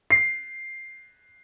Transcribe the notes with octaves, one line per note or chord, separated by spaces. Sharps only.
C7